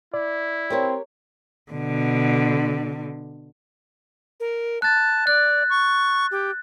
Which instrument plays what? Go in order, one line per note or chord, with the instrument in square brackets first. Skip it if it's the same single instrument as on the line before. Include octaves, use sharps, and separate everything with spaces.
[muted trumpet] E4 [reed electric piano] D5
[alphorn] C4 [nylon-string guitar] G4 A#4 C#5
[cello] B2 D3
[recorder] A#4
[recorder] A5 [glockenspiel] F#6 A6
[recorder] D5 [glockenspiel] F#6
[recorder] C#6
G4